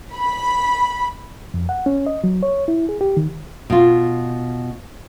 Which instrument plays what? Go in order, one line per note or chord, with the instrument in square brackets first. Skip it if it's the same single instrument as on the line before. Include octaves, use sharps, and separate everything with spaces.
[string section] B5
[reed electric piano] F2
F#5
C#4
D#5
F#3
C#5
E4
G#4
G4
D#3
[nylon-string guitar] B2 F4